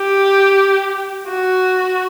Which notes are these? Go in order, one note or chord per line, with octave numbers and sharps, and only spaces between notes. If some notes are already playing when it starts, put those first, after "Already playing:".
Already playing: G4
F#4